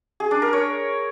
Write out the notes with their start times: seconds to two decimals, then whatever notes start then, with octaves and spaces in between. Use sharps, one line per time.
0.20 G#4
0.31 D4
0.42 A#4
0.53 C#5